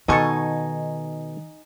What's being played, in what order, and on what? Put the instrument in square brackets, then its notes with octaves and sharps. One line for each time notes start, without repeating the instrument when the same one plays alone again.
[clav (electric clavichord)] B2 A4 [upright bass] D#3 [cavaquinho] D#4 G#5 C#6